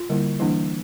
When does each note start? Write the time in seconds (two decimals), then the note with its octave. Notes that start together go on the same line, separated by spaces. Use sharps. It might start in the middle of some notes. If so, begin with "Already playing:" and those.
Already playing: F4
0.10 D3 G3 A#3 E4
0.39 E3 G3 A#3 D4 E4